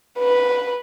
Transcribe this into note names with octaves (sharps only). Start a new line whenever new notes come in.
B4